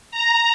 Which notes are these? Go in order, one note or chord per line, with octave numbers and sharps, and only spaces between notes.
A#5